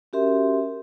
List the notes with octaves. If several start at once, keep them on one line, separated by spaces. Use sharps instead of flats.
C#4 F#4 G4 A#4 E5 C6